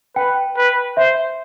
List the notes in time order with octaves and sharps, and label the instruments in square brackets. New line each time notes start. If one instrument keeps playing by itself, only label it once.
[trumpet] B4 [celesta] G5
[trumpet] B4
[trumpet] C5 [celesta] E5